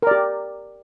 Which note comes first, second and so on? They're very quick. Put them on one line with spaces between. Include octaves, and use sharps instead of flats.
A#4 D5 G4